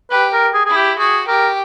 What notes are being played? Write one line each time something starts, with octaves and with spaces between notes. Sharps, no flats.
G4 B4
A#4
G#4
E4 G#4
G4
F#4 G#4
G4 A#4